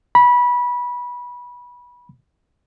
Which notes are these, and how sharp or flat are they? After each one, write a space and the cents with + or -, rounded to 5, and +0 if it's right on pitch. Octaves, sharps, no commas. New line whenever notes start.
B5 -20